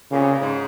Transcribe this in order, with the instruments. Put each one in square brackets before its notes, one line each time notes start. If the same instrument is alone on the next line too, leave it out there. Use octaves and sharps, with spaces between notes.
[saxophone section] A#2 [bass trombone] C#3
[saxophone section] C3
A#2
G#2